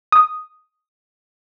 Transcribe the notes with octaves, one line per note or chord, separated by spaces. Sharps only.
D#6